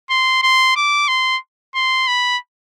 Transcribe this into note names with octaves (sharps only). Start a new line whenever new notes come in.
C6
C6
D6
C6
C6
B5